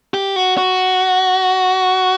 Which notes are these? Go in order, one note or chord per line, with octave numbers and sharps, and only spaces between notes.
G4
F#4
F#4